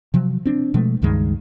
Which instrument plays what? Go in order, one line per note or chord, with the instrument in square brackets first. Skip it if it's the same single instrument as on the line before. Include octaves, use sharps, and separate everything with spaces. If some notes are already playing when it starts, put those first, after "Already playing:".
[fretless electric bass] C3 F3 F#3
C4 D4
B2 F3 G#3 A3
C#2 G2 D#3 G#3